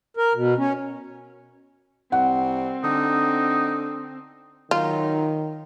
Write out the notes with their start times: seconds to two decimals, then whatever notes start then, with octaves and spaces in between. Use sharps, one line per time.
0.17 A#4
0.35 B2
0.58 C#4
2.12 C2 C4 F#5
2.84 D3 D#4
4.71 D#3 F#3 D#4 F4